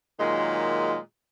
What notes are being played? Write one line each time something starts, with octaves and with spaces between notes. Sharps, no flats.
A#2 D#3 F#3 G#3